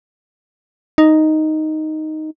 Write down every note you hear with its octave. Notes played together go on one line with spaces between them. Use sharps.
D#4